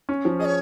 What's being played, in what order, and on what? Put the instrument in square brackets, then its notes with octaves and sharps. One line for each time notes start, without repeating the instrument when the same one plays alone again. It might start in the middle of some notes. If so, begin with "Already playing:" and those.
[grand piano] C#4
F3
[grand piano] G#4 [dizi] D#5
[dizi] C#5